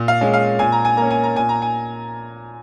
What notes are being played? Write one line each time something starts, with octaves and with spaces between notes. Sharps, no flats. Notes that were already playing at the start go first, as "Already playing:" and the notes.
Already playing: A#2
F5
G#3 C#4
F5
A#2 G#5
A#5
G#5
A#3 C#4 A#5
G#5
A#5
A#2 G#5
A#5
G#5